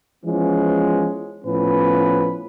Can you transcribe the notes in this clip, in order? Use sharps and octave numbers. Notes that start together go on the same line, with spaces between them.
E3 F3 G#3 B3 C#4
A2 F3 B3 C#4 B4